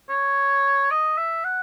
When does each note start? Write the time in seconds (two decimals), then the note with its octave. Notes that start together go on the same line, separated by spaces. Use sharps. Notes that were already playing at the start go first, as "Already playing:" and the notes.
0.09 C#5
0.90 D#5
1.18 E5
1.44 F#5